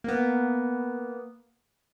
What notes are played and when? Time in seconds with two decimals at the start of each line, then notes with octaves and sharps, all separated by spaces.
0.04 A#3 B3